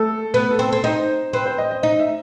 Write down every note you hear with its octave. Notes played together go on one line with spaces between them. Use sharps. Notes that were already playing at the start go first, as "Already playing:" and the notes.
Already playing: A3 A4
B3 B4
A4
C4
A4
C4
D#4 C5
C4 B4
C5
D#5
D#5
D#4 D#5
E5